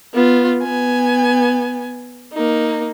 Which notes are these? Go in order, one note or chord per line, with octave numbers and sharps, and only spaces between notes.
B3 F4
B3 G#5
A#3 D#4